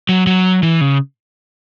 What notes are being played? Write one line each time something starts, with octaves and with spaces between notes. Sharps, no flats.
F#3
F#3
E3
C#3